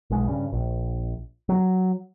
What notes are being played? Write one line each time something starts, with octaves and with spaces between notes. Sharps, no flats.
B1 G#3
G2 C#3
A#1
F#3